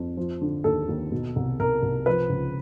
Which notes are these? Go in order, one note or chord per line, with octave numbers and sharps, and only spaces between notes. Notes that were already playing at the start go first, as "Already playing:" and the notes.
Already playing: F2
F3
D3
D#2 A4
D#2
B2
C2
C2 A#4
C2
F3 B4
C#2